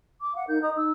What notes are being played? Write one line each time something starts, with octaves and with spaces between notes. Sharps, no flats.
D6
F5 F#5
D#4 A#4 G6
D#5 A#5 D#6
D#4 E6